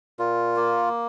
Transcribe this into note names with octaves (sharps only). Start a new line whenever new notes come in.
A#2 F4
A#3